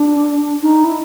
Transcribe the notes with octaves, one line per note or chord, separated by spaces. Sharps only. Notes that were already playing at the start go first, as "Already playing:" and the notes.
Already playing: D4
D#4
E4